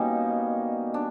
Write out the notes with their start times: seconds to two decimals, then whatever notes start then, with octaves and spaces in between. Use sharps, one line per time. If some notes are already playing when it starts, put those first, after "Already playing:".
Already playing: B2 G3 A#3 C#4 D#4
0.94 D4